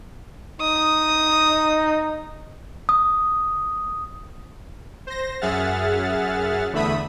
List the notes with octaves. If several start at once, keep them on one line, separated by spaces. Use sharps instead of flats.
D#4 D#6
D#6
C5 A#6
F#2 G#4 E5 F#5 F6 A6
E2 D3 A3 E5 B5 D#6